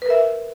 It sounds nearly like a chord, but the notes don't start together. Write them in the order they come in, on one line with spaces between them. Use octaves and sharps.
B4 A#4 E5